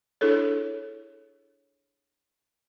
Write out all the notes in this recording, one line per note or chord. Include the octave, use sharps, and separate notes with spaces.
D4 E4 G#4 A4 C#5